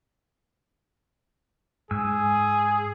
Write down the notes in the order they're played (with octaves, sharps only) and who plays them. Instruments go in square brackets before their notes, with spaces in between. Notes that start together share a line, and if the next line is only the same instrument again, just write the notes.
[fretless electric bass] G#2 [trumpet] G#4 [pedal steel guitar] G#5 E6